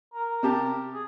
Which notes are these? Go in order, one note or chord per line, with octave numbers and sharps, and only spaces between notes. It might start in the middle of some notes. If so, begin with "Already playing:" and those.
A#4
C3 G4 A5
G#4